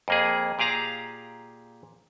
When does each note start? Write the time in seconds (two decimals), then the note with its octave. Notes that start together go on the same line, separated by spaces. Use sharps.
0.08 F2 A#3 G#4
0.59 A#2 G4 G#4 F5 A#5